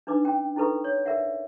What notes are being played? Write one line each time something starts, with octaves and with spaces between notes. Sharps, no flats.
D4 D#4 B4 D6
C#4 G5
D#4 E4 A4 B4 C#6
C#5
A#4 D5 E5 F#5